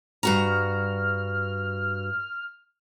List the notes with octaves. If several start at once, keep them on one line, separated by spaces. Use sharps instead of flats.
G2 F#4 A#5 F6